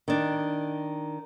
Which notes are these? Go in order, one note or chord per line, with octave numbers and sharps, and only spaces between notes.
D#3 D4